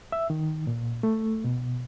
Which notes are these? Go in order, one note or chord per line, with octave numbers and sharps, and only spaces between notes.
E5
D#3
A#2
A3
B2